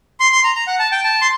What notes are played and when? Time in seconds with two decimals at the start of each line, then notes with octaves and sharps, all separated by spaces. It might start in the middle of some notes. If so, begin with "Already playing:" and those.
0.20 C6
0.32 C6
0.44 A#5
0.56 A#5
0.67 F#5
0.79 A5
0.92 G5
1.04 A5
1.22 C6